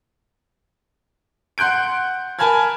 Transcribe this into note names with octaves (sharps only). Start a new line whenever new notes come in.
F#5 C6 F#6 G6 D7
A#4 G#5 A5 B5 F6 G#6